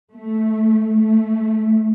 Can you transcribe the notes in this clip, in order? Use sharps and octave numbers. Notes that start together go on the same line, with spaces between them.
A3
A3